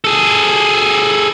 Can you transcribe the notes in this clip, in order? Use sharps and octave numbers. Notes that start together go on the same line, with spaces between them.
G#4 A4